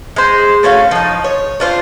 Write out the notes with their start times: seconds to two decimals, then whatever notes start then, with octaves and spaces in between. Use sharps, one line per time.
0.16 G#3 C5
0.63 A3 C#4 F#4 F5
0.91 F3 D#4
1.24 C#5
1.60 D4 F4 C5